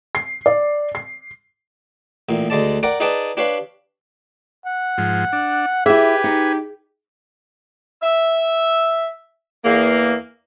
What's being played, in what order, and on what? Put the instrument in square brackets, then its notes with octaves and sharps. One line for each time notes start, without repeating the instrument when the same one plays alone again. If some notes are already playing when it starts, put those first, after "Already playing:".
[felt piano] C7
D5
C7
[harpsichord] A1 A#2
D2 G#3 D5 A5
A#4 D5 F#5 G5
D#4 G#4 B4 D5 G5 A5
D4 G4 B4 C#5 F5
[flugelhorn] F#5
[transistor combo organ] G#2 F3
D4
[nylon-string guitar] E4 E5 [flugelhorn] G4 [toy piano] G#4 [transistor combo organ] B4 G#5
[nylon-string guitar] D#4
[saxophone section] E5
E2 A#3